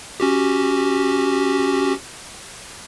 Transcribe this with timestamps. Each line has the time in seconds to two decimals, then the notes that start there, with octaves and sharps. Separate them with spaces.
0.20 C#4 F#4 G4